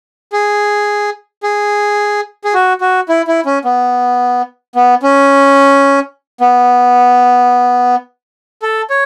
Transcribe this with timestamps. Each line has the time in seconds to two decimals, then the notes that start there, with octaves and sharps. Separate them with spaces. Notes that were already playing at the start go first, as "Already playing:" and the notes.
0.33 G#4
1.43 G#4
2.44 G#4
2.54 F#4
2.81 F#4
3.09 E4
3.28 E4
3.46 C#4
3.65 B3
4.75 B3
5.03 C#4
6.41 B3
8.62 A4
8.90 C#5